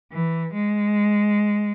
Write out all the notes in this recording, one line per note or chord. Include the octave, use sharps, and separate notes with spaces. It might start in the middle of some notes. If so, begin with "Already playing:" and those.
E3
G#3